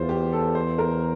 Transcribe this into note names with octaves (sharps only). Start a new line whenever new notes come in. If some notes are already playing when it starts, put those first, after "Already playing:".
Already playing: E2 F4 C5
G4
A4
C5
A#4